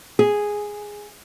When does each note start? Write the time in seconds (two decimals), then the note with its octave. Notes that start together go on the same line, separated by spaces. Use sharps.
0.19 G#4